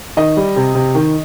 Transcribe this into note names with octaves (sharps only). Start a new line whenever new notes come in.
D#3 D#5
G3
C3
C3
D#3